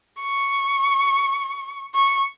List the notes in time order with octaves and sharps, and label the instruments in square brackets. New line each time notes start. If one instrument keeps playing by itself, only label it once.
[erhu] C#6
C#6